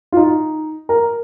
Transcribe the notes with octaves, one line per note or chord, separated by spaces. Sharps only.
F4
D#4
A#4